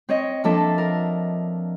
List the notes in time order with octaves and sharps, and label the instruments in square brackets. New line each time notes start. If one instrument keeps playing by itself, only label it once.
[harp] C4 C#5 D#5
F3 A#3 D4 A4 D#5 E5
A#4